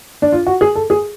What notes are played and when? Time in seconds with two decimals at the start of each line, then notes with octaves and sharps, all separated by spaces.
0.22 D4
0.32 F4
0.47 F#4
0.61 G#4
0.75 A4
0.90 G#4